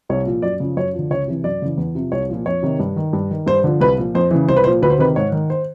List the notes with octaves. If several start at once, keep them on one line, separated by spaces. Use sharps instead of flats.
C2 C#5
A#2 F3
F#2 D5
C#3 F3
F#2 C#5
D3 F3
C#2 C#5
C3 E3
F#2 D5
C#3 E3
E2
C3 F3
C2 C#5
A#2 F3
F2 C#5
C3 D#3
G2
D#3
G2
D#3
G2 C5
D3 F3
C2 B4
A#2 F3
F2 C5
C#3 E3
C2 C5
B4
A#2 F3 C5
D2 B4
C5
C3 D#3 B4
G#2 C#5
D#3
C5